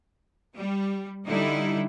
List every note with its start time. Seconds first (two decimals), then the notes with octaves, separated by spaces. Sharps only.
0.55 G3
1.25 D3 G3 D#4 E4